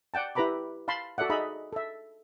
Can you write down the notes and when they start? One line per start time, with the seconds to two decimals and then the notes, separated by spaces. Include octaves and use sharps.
0.14 D5 F#5 G5 A5
0.35 E4 G4 B4 A#5 B5 D6
0.88 F5 A5 B5 C6
1.18 F#4 A4 D5 E5 F#5
1.30 D#4 G#4 D#5 E5 A#5 B5
1.73 A4 E5